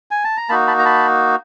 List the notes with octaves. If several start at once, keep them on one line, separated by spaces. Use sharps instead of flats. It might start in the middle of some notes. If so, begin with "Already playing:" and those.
G#5
A5
A#5
A#3 D#4 F#4 A5 B5
A5 B5
A#5
A5 B5